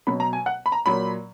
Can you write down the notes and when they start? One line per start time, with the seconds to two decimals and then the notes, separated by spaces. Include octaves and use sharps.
0.07 B2 F#3 B5
0.20 A#5
0.33 G#5
0.46 F#5
0.66 B5
0.72 A#5
0.85 A#2 F#3 B5